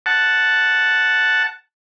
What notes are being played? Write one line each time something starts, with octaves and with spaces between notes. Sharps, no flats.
F#5 A5